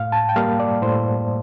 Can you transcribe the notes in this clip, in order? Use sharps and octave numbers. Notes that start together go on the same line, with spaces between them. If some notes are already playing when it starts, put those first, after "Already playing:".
Already playing: A2 F5
A5
G5
G3 A#3 F5
D5
A2 C5